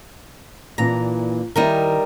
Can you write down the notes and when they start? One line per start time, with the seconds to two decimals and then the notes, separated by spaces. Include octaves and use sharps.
0.78 A#2 E3 D4 A#5
1.56 D#3 G3 D#4 E4 A#4 C5